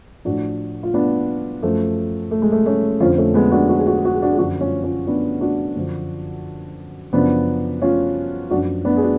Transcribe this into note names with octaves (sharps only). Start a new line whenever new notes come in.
A2 F3 D4 F#4
F4
B3 D4
F#2 F3 A3
A3
G#3
A3
A3 C#4
F2 D3 F3 C#4 F4
A3 C#4
G#3 B3
D4 F#4
F#4
G#4
F#4
G#4
F#4
G#4
D4 F#4
G#4
F#2 D3 F3 D4 F#4
C#4 F4
C#4 F4
B3 D4
D4 F#4
F#2 D3 F3
F#2 C#3 F3 B3 D4
C#4 F4
F#2 F3 D4 F#4
B3 D4
G#4
D4 F#4